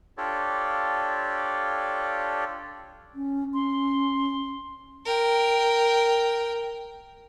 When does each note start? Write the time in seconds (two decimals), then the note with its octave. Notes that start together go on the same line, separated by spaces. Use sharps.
0.18 D4 F4 G4 A4 C#5 D5
3.15 C#4
3.54 C#4 C6
5.05 A#4 G5